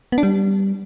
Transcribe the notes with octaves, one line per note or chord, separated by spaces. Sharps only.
B3
D4
G3